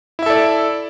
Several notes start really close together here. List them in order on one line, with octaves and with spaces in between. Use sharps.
E4 E5 A4 D5